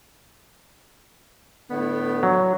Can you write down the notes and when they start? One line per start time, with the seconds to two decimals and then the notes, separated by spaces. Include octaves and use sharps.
1.70 A2 D3 B3
2.23 F#3